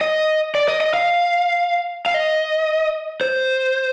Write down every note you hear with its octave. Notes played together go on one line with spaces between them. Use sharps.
D#5
D5
D#5
D#5
F5
F5
D#5
C5